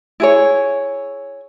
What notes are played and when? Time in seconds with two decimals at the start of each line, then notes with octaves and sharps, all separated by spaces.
0.20 E4 G#4 C#5